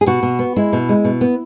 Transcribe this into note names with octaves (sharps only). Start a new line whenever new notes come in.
G#4
B2 F#4
B2
B3
G#3 E4
B2
G#3
B2
B3